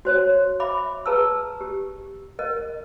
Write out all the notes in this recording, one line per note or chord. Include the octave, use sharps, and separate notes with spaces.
F#4 C5 C#5
E5 B5 D6
G#4 B4 A5 A#5 E6
G4
A#4 D#5